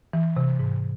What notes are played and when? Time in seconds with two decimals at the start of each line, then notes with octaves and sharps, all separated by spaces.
0.13 E3
0.37 C3
0.59 G#2